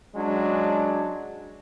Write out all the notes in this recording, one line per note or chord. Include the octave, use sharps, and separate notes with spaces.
F#3 G#3 C#4 D4